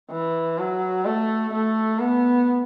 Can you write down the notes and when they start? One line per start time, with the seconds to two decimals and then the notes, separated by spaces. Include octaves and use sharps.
0.11 E3
0.59 F#3
1.05 A3
1.53 A3
1.99 B3